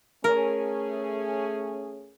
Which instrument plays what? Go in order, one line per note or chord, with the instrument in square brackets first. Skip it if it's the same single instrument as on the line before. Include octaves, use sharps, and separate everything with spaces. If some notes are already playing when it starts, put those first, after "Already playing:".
[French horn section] A3 C#4 G#4 [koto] A#4